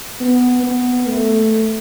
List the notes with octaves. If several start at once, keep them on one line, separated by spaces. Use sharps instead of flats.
B3
B3
A3